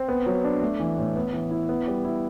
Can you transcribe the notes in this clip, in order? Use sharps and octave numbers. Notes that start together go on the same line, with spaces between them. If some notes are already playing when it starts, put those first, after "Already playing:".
Already playing: C4
B3
F#3
D4
A3
E3
A2
B3
E3
E4
B3
G3
E4